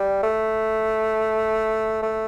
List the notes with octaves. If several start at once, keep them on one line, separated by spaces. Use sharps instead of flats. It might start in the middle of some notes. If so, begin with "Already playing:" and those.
Already playing: G3
A3
A3